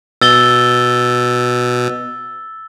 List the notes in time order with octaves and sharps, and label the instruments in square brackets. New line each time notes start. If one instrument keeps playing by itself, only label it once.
[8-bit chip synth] B2 [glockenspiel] E6 A6 G7